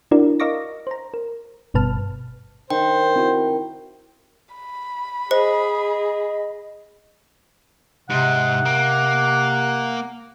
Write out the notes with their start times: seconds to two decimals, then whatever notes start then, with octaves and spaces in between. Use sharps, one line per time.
0.11 D4 E4 F#4 A#4 D5
0.40 A#4 D#5 F5 C#6 D6 A#6
0.87 C5 A#5
1.14 A#4
1.74 G1 G2 B2 B4 A5 F6
2.70 D#3 C5 G5
3.16 C4 E4 F#4
4.55 B5
5.31 G#4 C5 D#5
8.10 G#2 C3 G#3 F#5
8.65 A#3